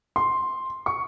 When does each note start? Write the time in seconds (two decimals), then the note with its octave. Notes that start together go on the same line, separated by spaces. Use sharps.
0.16 C6
0.86 C#6